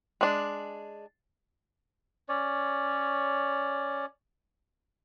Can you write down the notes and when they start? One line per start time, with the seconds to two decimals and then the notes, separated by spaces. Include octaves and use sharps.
0.21 G#3 D4
2.29 C#4 C#5 D5